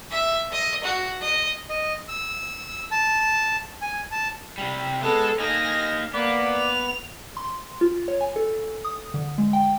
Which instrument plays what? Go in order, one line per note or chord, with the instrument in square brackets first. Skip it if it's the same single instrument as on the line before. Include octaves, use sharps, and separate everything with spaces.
[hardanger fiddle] E5
D#5
F#4
D#5
[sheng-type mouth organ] D#5
E6
A5
G#5
A5
[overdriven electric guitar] C3 G3
[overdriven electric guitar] G#3 [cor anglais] B3 [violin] A4
[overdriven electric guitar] A#3 D#4 [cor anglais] D#5 [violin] G#5 A#6
[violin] A#3 [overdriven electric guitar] B3 [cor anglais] D5
[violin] F7
[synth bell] C6
F4
C#5
G#5
A4
D#6
D3
G#3
G5